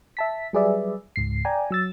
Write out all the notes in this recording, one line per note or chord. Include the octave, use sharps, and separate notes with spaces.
E5 A5 B6
F#3 G3 G#4 B4 D5 E5
C#2 G#2 C7
D5 G5 G#5 A#5
F#3 E6 A6